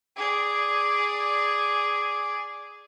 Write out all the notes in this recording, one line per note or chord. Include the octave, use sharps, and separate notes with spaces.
G#4 D5